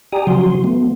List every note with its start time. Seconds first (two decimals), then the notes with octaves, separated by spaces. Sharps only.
0.12 G4 D5 G5 G#5 A#5 D#6
0.27 C#3 F3 F#3 F#4 C6
0.64 A3 B3